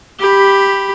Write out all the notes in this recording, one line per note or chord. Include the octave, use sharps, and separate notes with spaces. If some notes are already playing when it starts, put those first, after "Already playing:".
G4 B5